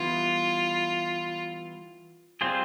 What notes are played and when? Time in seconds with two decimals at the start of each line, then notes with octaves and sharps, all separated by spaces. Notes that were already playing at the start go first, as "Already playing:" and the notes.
Already playing: E3 G3 B3 E4 F4
2.41 G3 C4 F4 G#4 C5